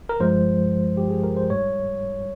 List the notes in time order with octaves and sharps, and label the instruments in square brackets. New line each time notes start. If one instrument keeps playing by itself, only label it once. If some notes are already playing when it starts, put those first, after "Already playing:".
[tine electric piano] A#4
G2 F3 G#3 C5
G4
G#4
A#4
C5
G#2 G3 C#5